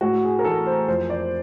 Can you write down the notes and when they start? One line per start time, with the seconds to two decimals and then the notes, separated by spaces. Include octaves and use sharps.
0.01 A2 F#4
0.24 G#4
0.39 A#4
0.44 E3 A4
0.66 C5
0.88 F2 C5
1.10 D5